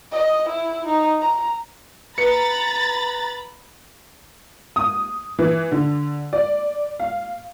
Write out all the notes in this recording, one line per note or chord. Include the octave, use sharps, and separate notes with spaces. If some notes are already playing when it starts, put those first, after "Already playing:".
D#5
E4
D#4
A#5
B4 A#5 B5 A6 C#7
D#6
E3
D3
D5
F5